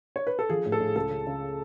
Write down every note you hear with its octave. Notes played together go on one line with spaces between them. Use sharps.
C#5
B4
A4
F3 G#4
A2
A4
A2
G#4
C#2 A4
C#3
C#3